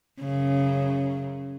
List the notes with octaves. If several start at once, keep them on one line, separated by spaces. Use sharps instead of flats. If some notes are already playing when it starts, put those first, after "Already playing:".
F#2 C#3